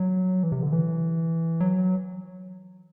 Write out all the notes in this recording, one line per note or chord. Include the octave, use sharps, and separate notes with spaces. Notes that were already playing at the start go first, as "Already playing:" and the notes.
Already playing: F#3
E3
C3
D3
E3
F#3